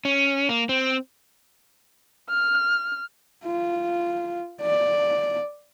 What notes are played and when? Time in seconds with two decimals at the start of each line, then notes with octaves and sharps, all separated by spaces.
0.05 C#4
0.49 A#3
0.69 C4
2.30 F6
3.44 F4
4.62 D5